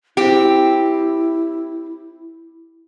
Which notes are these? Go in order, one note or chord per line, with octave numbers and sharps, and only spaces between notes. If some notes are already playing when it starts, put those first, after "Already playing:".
C4 E4 G4